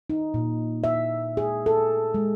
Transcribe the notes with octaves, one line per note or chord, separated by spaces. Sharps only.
D#4
A#2
E5
G#4
A4
G#3